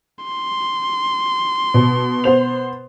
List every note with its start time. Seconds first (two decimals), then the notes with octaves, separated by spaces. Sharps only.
0.25 C6
1.74 B2
2.24 B3 C5 F7